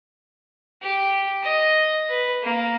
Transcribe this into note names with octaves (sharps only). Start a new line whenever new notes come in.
G4
D#5
B4
A#3